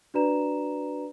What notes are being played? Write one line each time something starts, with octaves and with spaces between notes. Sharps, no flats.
D4 F#4 B4 D5 A#5 E7